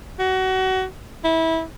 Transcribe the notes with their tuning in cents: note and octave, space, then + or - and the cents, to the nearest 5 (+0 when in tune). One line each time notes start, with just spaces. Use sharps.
F#4 +25
E4 -20